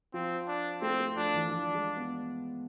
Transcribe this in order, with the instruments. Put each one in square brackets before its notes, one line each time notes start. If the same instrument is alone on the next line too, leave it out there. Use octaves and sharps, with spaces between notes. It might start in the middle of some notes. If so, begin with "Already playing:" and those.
[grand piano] F3 [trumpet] C4
[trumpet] D4
[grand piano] A3 [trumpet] C4
[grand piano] A3
[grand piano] F3 [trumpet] D4
[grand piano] E3
[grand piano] F3 [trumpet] D4
[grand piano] G#3
B3